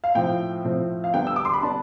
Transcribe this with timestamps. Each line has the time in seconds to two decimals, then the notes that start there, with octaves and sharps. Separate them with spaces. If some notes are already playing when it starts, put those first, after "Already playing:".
0.04 F5
0.15 A2 F3 C4 G5
0.65 A2 F3 C4
1.04 F5
1.14 D3 G3 B3 D4 G5
1.27 E6
1.36 D6
1.45 C6
1.54 B5
1.62 D3 G3 B3 D4 A5